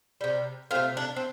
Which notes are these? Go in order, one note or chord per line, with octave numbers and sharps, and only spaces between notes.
C3 G3
C3 A3 C4 F4
D4
C4